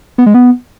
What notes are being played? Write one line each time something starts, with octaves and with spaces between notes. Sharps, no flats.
B3
G#3
B3